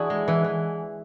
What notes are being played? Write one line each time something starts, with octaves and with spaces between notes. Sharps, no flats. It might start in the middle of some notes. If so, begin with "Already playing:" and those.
Already playing: E3 D4 E4 F#4 G#4
G#3
E3
E3